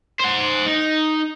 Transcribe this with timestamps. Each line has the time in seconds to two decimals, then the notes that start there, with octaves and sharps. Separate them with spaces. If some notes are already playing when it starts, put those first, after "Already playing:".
0.20 C5 F#5
0.66 D#4